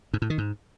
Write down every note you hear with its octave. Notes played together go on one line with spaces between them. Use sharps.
G#2
A2
D#3
G#2